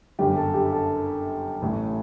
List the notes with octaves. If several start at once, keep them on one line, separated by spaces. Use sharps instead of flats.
G1 F#2 D3 G4
A4
G4
A4
A1 A2